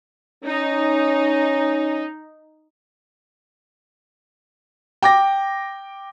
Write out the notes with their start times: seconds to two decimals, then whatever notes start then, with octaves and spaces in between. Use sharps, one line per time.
0.44 C#4 D#4
5.02 G5 D6 A#6